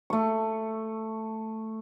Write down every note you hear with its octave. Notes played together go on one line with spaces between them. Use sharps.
A3 C#6